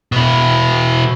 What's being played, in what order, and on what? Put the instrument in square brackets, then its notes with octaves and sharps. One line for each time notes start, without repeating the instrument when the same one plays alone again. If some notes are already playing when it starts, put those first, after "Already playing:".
[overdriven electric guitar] B2 E4